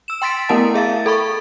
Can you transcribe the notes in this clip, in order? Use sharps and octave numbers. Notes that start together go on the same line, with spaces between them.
E6 E7
G5 C6 A6 B6 D7
A3 B3 E4 A#4 F#5 A5
G#4 E5 F5 A6
A4 B5 C#6 A6